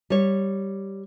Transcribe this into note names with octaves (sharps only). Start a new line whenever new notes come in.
G3 C#5